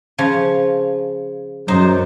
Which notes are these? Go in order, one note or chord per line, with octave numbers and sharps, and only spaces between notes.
C#3 F3 C#5
F#2 D#4 C5